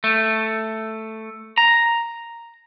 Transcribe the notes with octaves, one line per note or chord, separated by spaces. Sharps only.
A3
A#5